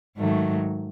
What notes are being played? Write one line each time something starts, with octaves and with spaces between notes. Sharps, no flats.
G#2 D#3 F#3 A3